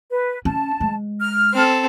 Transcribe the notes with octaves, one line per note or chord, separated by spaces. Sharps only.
B4
C#4 A5
G#3
F6
C4 A4